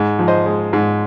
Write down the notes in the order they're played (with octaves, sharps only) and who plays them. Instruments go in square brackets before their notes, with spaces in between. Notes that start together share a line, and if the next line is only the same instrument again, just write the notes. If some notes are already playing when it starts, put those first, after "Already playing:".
Already playing: [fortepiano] G#2
F3
C5 D#5
G#3
G#2